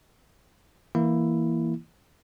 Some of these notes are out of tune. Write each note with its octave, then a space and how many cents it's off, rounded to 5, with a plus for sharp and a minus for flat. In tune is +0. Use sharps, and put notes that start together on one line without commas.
E3 +0 A#3 +5 E4 +5